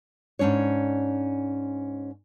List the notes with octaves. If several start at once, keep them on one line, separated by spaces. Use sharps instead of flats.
G#2 D#3 C#4 D4 C#5